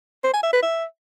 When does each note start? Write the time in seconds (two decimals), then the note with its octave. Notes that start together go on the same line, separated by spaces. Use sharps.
0.24 C5
0.33 G#5
0.43 E5
0.53 B4
0.62 E5